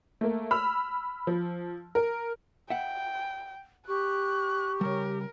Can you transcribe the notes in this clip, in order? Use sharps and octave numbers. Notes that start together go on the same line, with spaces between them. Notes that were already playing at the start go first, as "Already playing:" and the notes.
A3 A#3
B5 E6 F6
F3
A#4
E5 F#5 G5
G4 C#6 F#6
C#3 G3 A#4